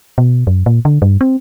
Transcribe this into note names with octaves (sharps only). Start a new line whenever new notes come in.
B2
F#2
A#2
D3
G2
C4